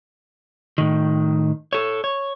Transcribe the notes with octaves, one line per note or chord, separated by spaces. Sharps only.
A2 D#3
A4 C#5
C#5